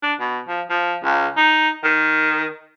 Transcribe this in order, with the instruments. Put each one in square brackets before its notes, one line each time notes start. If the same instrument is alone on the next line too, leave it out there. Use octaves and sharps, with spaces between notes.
[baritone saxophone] D4
B2
F3
F3
C#2
D#4
D#3